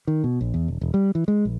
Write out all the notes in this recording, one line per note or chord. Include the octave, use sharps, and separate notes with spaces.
D#3
B2
A#1
E2
E1
E1
G3
E3
G#3
A#1